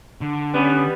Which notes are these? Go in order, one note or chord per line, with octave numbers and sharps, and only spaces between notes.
D3
G3 B3 C#4